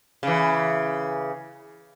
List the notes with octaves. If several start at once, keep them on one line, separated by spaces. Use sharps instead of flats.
C#3 E3